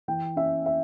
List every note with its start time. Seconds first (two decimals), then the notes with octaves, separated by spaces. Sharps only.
0.08 E3 G5
0.36 C#4 E5
0.66 E5